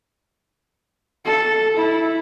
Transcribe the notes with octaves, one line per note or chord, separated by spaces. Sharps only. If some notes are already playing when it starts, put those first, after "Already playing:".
A4
E4